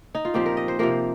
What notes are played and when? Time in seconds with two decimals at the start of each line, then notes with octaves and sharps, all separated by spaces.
0.15 D#4
0.25 F4
0.34 A#2 F3 C4 G4
0.46 A#4
0.57 D#5
0.68 C5
0.79 C3 F3 A#3 A#4